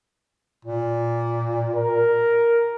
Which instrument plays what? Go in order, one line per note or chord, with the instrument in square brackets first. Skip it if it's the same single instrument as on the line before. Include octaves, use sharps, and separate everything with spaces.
[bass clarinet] A#2
[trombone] A#4